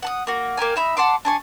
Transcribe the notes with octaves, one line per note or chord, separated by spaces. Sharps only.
F#5 A5 D#6
A#3 F#4
A#3 G4 A#4 G#5
D#4 E5 B5
F#5 A5 C6 D6
D4 G#5 C#6